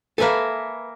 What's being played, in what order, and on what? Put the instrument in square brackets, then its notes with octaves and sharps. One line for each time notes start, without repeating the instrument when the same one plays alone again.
[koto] A#3 E5 G#5 [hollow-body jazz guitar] A4 B4